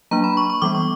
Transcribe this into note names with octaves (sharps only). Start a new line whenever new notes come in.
F#3 A#3 D4 A#5
B5
C#6
C#6
E3 G3 B3 D6
C#6